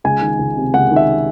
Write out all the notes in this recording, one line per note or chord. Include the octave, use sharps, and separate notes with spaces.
C#2 G#5
D#3
C#2
C3
C#2 F#5
D#3
E5